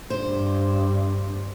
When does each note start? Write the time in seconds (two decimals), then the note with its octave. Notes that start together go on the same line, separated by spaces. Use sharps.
0.10 G2 C5